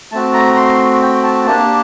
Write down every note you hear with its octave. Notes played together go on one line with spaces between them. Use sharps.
A3 C4 F#4 A5
A#5
A#5
C6
G5
A5
A#3 D4 G4 A5